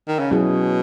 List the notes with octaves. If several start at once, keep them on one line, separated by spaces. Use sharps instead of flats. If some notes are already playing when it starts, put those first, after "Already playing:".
D#3
C#3
B2 F#3 C#4 E4 G#4